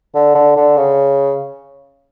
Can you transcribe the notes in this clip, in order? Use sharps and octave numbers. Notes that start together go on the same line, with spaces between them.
D3
D3
D3
C#3